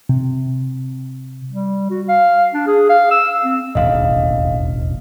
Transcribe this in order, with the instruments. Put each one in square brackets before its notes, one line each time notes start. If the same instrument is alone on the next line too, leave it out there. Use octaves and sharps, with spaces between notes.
[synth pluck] C3
[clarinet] G3
F#4
F5
D4
G#4
F5
E6
C4
[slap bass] E1 A1 D#2 [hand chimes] D#5 F5